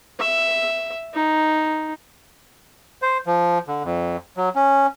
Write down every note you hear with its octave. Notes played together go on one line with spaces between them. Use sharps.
E5
D#4
C5
F3
D3
F2
F#3
C#4